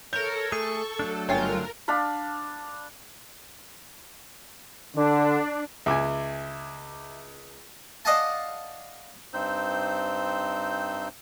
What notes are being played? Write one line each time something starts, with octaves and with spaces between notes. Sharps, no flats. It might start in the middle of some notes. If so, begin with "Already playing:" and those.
A4 A#4 C#5 G6
A3 G#4 C#6
F#3 A3 D4
G1 F4 A#4 C#5 G5 G#5
D4 F5 A5 B5
D3 D4
C#2 E5 G#5 D6
D5 D#5 F5 F#5 G#5 A5
G2 C4 D#4 C5 E6 G6